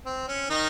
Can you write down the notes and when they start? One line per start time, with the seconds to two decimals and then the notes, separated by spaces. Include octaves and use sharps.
0.06 C4
0.28 C#4
0.50 D#3 D#4